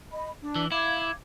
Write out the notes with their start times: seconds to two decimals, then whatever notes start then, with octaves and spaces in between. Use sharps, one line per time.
0.11 D#5 B5
0.40 D4
0.56 E3
0.72 E4 F5 D6 G#6